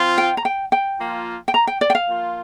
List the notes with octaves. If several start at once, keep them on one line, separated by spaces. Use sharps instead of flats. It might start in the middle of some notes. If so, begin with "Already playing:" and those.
Already playing: F3 C4 F4
G5
A#5
G5
G5
F3 A#3 F4
G5
A#5
G5
D5
G5
F5
F3 A#3 F4